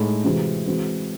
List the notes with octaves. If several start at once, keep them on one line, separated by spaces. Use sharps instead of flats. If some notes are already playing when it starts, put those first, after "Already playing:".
Already playing: A2 G#3 D#4 G#4
C3 E3 G#3 C4 F#4
E3 G#3 C4 F#4